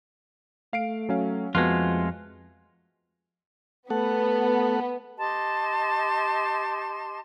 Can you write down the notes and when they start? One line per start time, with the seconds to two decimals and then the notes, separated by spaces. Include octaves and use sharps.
0.73 A3 F5 C7 D7
1.09 F#3 C#4 F5
1.55 F2 F3 G#3 A3 B3 F4 F#4 F#6
3.90 A3 B3 A4 F#5
5.17 G4 D#5 A5 C6